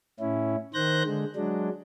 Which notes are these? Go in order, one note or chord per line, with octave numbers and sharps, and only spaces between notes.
A2 C#4 E4
D#3 C5 F#6 G6 A#6
D3 G#3
F#3 G#3 D4